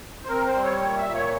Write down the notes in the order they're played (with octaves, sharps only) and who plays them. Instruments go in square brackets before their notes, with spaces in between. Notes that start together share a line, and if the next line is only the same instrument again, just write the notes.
[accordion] C5
C4 A#4
C5
G3
C#5
A#2 C#5
E5
A#2
C#5